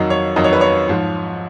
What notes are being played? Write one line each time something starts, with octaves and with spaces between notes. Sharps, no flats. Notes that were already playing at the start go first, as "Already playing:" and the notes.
Already playing: F2 D#3 F#3 D#5
C#5
F2 D#3 F#3 D#5
C#5
B4
C#5
G#2 F3